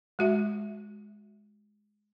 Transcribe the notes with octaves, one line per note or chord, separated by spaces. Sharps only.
G#3 F#4 E5